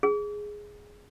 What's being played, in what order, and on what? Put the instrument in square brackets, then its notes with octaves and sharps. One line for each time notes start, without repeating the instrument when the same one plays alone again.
[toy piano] G#4